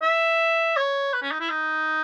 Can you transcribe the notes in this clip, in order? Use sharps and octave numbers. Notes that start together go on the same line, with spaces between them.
E5
C#5
B4
C#4
D#4
E4
D#4